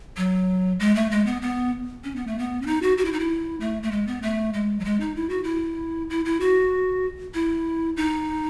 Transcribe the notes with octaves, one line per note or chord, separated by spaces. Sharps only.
F#3
G#3
A3
G#3
B3
B3
C#4
B3
A3
B3
C#4
D#4
F#4
F#4
E4
D#4
E4
A3
A3
G#3
B3
A3
G#3
F#3
G#3
D#4
E4
F#4
E4
E4
E4
F#4
E4
D#4